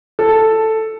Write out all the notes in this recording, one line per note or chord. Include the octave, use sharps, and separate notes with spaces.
A4